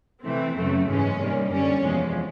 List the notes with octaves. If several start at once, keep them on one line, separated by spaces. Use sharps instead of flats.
C3 E3 A3 C4
F#2 C#3 F#3 A3
G#2 E3 G#3 C#4
C3 D#3 G3 A#3
F#2 D3 G3 C#4
E2 C3 F3 G#3